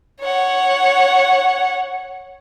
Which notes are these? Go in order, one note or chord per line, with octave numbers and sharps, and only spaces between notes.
C#5 F#5